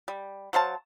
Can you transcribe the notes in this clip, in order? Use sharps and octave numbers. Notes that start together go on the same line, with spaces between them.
G3
F#3 C5 F5 A5